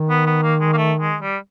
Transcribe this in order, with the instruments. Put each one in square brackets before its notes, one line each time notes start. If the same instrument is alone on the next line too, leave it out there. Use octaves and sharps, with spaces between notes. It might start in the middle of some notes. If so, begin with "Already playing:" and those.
Already playing: [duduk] D#3
[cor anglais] B3
B3
A#3
G#3
A#3
A3
G#3
G3